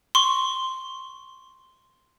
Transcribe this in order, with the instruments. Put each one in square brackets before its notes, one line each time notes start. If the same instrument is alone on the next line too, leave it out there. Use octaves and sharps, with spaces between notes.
[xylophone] C6 C#6